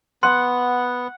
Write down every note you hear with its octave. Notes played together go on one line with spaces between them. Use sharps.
B3 F#5 C6